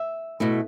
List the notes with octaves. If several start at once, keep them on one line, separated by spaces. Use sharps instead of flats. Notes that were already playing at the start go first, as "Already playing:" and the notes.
Already playing: E5
B2 A3 E4